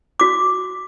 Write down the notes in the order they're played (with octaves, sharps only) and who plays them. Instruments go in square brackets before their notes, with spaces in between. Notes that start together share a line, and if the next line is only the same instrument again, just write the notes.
[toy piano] F#4 D6